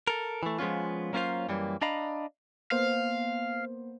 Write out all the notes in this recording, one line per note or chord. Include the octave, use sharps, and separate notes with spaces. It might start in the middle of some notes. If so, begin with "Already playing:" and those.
A4 A#4
E3 A3
F3 G#3 B3 C#4 F4
F#3 A#3 C#4 F4 C5 F5
F#2 E3 G3 A#3
D4 D5 D#5 F5 A#5 B5
A#3 B3 C5 F5